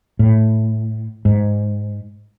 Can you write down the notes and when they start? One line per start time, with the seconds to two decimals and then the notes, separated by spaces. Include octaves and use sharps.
0.19 A2
1.25 G#2